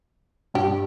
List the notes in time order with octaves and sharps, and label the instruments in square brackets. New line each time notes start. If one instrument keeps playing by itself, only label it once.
[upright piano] G2 G3 [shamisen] G4